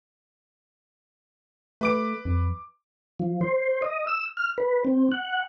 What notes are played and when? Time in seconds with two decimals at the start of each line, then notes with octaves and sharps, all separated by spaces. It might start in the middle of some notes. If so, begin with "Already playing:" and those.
1.81 A3 B4 D6 D7
2.25 F2
3.20 F3
3.41 C5
3.82 D#5
4.07 E6
4.37 F6
4.58 B4
4.85 C4
5.12 F#5